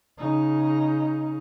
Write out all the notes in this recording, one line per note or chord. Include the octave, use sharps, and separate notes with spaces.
C#3 D#4